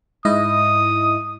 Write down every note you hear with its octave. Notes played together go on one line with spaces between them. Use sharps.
G#2 E4 D#5 D#6